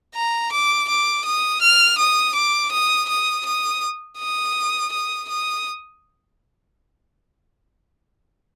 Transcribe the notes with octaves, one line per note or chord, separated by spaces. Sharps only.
A#5
D6
D6
D#6
F6
D#6
D6
D#6
D#6
D#6
D#6
D#6
D#6